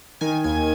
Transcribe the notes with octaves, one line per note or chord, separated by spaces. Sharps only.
D#3 G#5
D#2 G#5